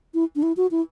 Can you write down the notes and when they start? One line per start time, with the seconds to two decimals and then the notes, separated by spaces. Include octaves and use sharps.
0.14 E4
0.36 D4
0.43 E4
0.57 F#4
0.71 E4